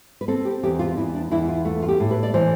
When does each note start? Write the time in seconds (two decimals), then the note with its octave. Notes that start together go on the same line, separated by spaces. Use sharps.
0.21 B4
0.28 C4 A4
0.45 G4
0.63 E2 G4
0.79 F4
0.97 E2 E4
1.15 D4
1.31 E2 E4
1.49 F4
1.65 A3 F4
1.82 F4
1.88 G4
2.00 A2
2.11 B4
2.23 D5
2.34 E3 C5